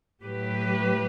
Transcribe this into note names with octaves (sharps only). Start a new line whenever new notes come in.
A2 F#3 G4 B4